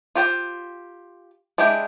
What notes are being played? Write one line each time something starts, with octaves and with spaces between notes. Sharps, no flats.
F4 G4 C5 G5
G#3 D4 E4 G4 G5